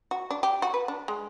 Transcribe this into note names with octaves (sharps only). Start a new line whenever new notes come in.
F#4
D4
G4
F#4
B4
D4
G#3